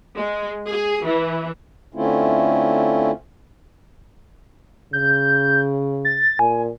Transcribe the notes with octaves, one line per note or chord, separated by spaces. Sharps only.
G#3
G#4
E3
D3 A3 C4 C#4 E4 F4
C#3 G6
A6
A#2 G#5